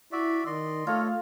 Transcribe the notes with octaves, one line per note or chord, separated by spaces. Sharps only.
E4 F#4 D5 E5
D#3 D5 D#5 C6
A3 F4 A4 C#5 D#5 F5